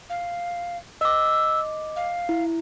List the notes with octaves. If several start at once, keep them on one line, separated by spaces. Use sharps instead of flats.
F5
D#5 D6 E6
F5
E4